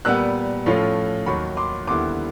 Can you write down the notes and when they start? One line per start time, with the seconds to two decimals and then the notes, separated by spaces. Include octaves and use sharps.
0.05 A#2 G3 B3 E6 F#6
0.66 A2 F3 A3 C#4 F4
1.26 D#2 D#3 F#3 B5 C#6
1.57 C6 D6
1.87 D#2 D3 G3 B3 E4 C6 D6